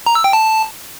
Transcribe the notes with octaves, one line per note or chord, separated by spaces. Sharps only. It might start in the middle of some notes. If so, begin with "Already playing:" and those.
A#5
E6
G5
A5